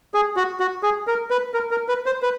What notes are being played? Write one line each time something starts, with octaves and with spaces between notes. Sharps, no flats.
G#4
F#4
F#4
G#4
A#4
B4
A#4
A#4
B4
C5
B4